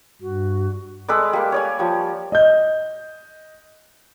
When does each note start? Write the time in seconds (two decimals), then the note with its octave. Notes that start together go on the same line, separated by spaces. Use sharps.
0.22 G2 F#4
1.08 G#3 A4 B4 D5
1.33 G3 A#3
1.52 C#5 D5 G#5
1.79 F3 G3
2.32 D#5 G6